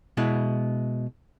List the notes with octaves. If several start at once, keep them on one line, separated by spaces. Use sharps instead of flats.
B2 G#3 E4